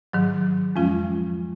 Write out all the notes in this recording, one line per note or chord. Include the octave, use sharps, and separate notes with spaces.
G#2 D#3 F#3
F2 F3 G#3 C#4 F4